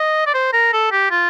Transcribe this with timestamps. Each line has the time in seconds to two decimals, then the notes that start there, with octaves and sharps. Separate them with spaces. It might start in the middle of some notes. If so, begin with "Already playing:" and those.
Already playing: D#5
0.26 D5
0.34 C5
0.53 A#4
0.73 A4
0.92 G4
1.11 F4